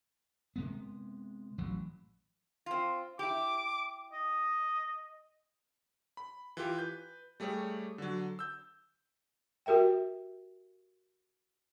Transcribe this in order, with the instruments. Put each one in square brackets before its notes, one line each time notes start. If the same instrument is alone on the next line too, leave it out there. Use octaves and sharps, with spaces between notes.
[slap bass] C3 G#3 B3
A1 E3 F#3
[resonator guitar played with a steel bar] C4 F4
[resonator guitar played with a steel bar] E4 G4 [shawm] D6
[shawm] D#5
[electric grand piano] B5
E3 F4 G4
B4 G6
G3 A3 G4 G#4 C#5
D3 F#3
E6 G6
[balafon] F#4 G4 A#4 E5 G5